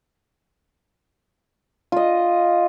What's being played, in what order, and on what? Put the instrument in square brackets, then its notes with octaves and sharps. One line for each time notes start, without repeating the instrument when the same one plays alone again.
[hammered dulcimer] F4 D#5